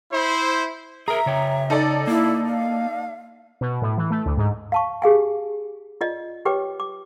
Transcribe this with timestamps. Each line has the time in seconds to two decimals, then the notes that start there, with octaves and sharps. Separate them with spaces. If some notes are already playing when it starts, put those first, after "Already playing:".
0.12 E4 C5
1.08 G#4 A#4 E5 A#5
1.26 C#3 C#5 G5
1.70 D#4 A4 D5
2.07 A#3 E4
2.46 F5
3.61 B2
3.82 A2
3.97 E3
4.10 A3
4.26 D2
4.37 G#2
4.72 F5 A5 C#6
5.02 G4 G#4 F5 G#5
6.01 F4 D5 D#5
6.45 G4 B4 C#5 G5 D6
6.80 D6